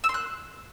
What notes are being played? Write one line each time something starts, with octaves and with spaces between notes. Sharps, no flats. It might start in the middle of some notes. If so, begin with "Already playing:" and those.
E6
C6
F#6